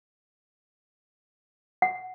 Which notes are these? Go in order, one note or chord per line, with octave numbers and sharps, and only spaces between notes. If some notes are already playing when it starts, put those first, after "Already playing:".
F#5